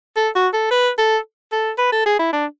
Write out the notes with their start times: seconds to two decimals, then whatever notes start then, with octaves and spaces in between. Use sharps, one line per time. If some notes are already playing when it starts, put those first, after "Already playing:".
0.16 A4
0.35 F#4
0.53 A4
0.71 B4
0.98 A4
1.52 A4
1.78 B4
1.92 A4
2.06 G#4
2.19 E4
2.33 D4